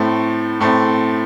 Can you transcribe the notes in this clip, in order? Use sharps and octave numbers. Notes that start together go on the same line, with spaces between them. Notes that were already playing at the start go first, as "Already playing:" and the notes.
Already playing: A2 A3 C4
A2 A3 C4